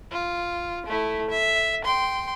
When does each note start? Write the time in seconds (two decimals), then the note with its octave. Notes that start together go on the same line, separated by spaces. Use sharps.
0.11 F4
0.86 A3 E4
1.30 E5
1.85 G5 C6